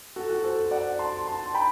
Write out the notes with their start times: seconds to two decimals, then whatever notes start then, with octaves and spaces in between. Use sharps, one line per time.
0.16 F#4 A4
0.30 F#4
0.44 A4 C5
0.71 D5 F#5
0.99 A5 C6
1.27 A5 C6
1.54 G5 B5